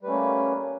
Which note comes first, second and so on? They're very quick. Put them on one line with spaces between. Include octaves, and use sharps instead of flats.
G3 B4 A3 C#4 A#3